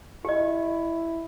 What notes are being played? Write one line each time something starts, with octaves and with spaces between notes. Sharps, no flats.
E4 G4 D#5